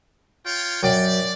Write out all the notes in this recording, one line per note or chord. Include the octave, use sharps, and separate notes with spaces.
F4 C#5 G5
F#2 D5 G5